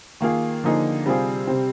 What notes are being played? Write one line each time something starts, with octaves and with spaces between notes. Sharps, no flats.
D#3 A#3 F4 G#4
D3 F3 A#3 D#4 G#4
C3 G3 C4 F4 G#4
C3 G3 C4